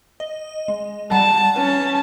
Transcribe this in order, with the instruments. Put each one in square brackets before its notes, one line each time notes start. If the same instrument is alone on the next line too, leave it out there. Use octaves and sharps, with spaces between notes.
[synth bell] D#5
G#3
[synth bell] G3 F#5 A#5 [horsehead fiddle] A5
[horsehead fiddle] C#4 A5 [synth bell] B4